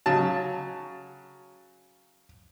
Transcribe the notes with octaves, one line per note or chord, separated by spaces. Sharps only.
C#3 F#3 A5